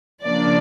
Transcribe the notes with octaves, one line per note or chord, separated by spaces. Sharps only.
C#3 F3 A#3 D4 D5